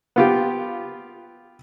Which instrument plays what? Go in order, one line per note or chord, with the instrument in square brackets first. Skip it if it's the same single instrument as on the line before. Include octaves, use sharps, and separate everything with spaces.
[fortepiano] B3 F4 G4